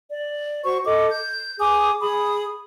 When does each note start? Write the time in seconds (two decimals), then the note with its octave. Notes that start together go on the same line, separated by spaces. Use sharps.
0.12 D5
0.64 F#4 C5 C#6
0.85 A4 D#5 D6
1.11 G6
1.60 G#4 G#5 D6 D#6
2.01 G#4 B5 D#6